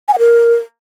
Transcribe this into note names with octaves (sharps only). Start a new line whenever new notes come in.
G#5
F#5
A#4